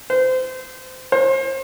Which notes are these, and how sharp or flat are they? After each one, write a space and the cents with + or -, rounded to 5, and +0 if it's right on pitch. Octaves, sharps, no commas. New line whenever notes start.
C5 -25
C5 +35